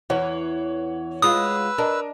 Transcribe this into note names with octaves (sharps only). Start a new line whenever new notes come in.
E2 E3 C#5 F#5
G#3 F4 B4 D#6 E6
D4 A#4 D#5